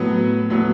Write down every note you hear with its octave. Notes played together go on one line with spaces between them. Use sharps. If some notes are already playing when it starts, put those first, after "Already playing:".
Already playing: A2 F#3 B3
A2 F#3 B3